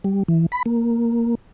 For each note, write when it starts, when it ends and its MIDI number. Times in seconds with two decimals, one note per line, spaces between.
0.04 0.23 55
0.28 0.46 52
0.52 0.63 83
0.66 1.35 58